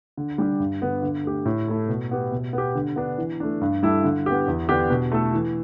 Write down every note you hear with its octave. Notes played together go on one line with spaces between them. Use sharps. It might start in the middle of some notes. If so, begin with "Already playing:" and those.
D3
G3 D4 G4
G2
D3 B3
D3
A3 G4
A2
A3 E4 A4
B2
B3 G4
B2
B3
G4
D3
B3 D4
E3
A3 D4
G2
G3 E4 A4
D3
B3 G4
E2
D3 B3 D4 G4
B2
A3 E4 A4
E3